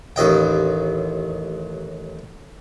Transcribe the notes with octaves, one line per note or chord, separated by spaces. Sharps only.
A1 D#2 D#5 G5